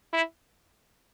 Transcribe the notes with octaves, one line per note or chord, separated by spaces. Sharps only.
E4